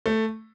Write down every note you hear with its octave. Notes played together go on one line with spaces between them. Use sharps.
A3